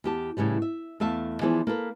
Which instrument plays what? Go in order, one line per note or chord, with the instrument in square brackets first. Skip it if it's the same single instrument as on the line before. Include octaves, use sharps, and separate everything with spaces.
[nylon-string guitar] E2 G4 A5
A2 C#3 E3 G3
E5
E2 A3 E5 F5 A5
E3 F3 B3 G#4 C5 D5
A#3 A4 B4